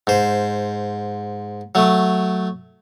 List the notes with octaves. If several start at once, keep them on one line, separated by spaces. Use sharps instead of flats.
G#2 C5
F#3 A3